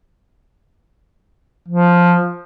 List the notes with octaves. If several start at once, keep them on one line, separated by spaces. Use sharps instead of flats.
F3